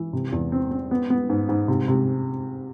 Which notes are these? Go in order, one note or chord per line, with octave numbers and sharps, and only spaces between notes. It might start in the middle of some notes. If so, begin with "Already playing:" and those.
Already playing: E3
C3
E2
C4
C4
B3
B3
G#2
G#2
C3
C3